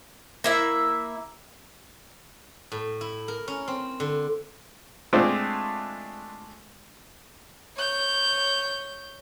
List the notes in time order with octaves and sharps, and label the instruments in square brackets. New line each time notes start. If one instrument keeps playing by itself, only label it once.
[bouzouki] A#3 E4 E5
[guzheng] A2
E4
A#4
C#4
C4
D3
[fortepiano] G#3 A3 C4 D4 F4
[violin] C#5 G6